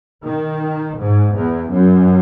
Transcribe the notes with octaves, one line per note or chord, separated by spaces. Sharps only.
D#3
G#2
E2
F#2